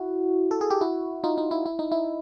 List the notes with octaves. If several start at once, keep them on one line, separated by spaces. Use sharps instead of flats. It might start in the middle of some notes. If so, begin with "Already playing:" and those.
Already playing: E4 F#4
A4
G#4
G4
E4 F#4
D#4 F4
D#4
E4
E4
D#4
E4